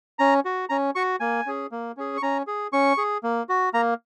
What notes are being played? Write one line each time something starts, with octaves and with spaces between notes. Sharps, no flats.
C#4 A#5
F#4
C#4 A#5
F#4 C#6
A#3 G#5
C#4 G#4
A#3
C#4 G#4
C#6
C#4 A#5
G#4
C#4 C#6
G#4
A#3
F#4
A#3 A#5